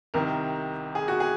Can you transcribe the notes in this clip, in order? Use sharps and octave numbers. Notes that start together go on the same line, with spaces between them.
C2 C3 D#3 A#4
G#4
F#4
G#4